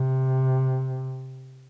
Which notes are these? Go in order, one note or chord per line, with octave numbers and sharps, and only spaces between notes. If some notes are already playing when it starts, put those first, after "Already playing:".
Already playing: C3